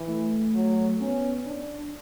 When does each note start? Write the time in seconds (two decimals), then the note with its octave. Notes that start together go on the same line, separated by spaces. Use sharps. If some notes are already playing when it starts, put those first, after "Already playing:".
Already playing: E3
0.09 A3
0.55 F#3
1.01 B3 C#4
1.46 D4